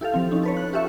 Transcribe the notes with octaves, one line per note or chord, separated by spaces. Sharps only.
E4 G4 A4 F5
F3 C4
C#4 D#4
A4 B4 C#5
F#6
F4 G4 A4 E5 C#6